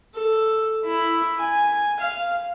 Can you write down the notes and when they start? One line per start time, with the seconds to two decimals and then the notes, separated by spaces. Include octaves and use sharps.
0.14 A4
0.85 E4
1.39 G#5
2.00 F5